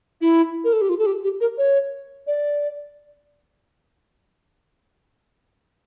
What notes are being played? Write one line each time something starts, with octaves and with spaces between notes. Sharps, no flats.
E4
A#4
A4
G4
F4
A4
G4
G4
A#4
C#5
D5